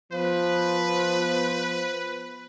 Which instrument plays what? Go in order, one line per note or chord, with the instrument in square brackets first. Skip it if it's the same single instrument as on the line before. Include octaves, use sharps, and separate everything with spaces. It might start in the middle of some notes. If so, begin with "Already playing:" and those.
[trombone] F3 [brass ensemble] B3 C5 [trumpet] B4